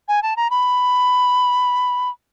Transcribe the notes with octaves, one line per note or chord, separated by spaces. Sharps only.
G#5
A5
A#5
B5